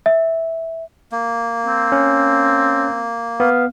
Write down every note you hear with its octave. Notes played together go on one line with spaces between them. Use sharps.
E5
A#3
C4
C#4
B3 F5